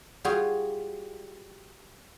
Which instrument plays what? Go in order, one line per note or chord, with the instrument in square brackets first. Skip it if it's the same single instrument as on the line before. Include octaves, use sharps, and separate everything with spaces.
[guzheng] G3 F4 F#4 G#4